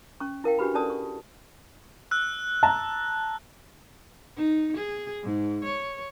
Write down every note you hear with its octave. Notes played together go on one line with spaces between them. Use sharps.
C#4 C#6
E4 A#4 F5 G5
D4 F#4 G4 B4 B5
C#4 E4 A4 D5 A5 D#6
C#6
E6 F#6
A5 A#5
D#4
G#4
G#2
C#5